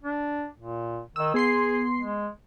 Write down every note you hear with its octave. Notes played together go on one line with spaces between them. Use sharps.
D4
A#2
D#3 D#5 E6
B3 G#4 C6 C7
G#3